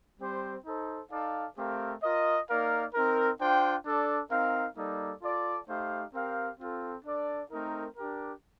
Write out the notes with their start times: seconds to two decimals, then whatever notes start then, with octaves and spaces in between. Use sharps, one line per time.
0.20 G3 C4 G4 C5
0.65 D#4 A4 C5
1.11 D#4 A4 D5 F5
1.57 A3 C4 G4 A#4 F5
2.03 F4 A#4 D#5
2.49 A#3 D#4 A#4 D5 F5
2.94 C4 D#4 A#4
3.40 D4 F4 C5 G5
3.85 D4 A4 D5
4.31 C4 D#4 A#4 F5
4.77 G3 A#3 D#4 A4 D5
5.22 F4 A4 D5
5.68 A3 D#4 G4 C5 F5
6.14 C4 G4 A#4 F5
6.60 C4 F4 A4
7.05 D4 A4 D5
7.52 A3 C4 D#4 A#4
7.96 D4 G4 A#4